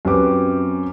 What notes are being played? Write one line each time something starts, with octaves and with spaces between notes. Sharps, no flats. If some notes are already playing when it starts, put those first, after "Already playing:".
F#2 C4 G4 B4 D6